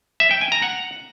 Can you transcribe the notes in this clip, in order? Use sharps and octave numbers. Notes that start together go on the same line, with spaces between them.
E5
G5
G#5
A#5
F#5